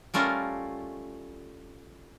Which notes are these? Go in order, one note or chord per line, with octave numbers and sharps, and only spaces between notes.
G3 A3 C#4 F4 A#4